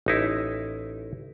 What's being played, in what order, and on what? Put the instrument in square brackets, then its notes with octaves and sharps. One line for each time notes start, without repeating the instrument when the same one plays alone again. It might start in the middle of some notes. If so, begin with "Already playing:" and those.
[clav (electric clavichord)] A1 D#4 E4